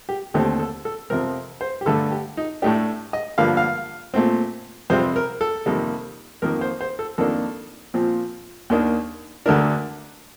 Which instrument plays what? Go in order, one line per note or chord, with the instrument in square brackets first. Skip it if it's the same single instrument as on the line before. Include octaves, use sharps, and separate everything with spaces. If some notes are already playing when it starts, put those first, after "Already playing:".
[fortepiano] G4
D#2 D3 A3 C4 G4
A4
A4
F2 C3 F3 C4 A#4
C5
G4
G2 D3 A3 A4
G4
D#4
A2 A3 D4 G4
D#5
G2 D3 F3 A#3 F5
F5
A#2 A3 C4
F2 C3 G3 C4 C5
A#4
A4
F2 C3 D#3 G3 A#3
F2 D#3 A#3 A#4
C5
C5
A4
F2 D#3 A#3 D4 A4
A#2 F3 C4
D#2 D#3 A#3 D4
D2 D3 A3 D4 A#4